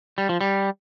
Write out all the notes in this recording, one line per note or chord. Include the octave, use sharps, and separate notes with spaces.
G3
F3
G3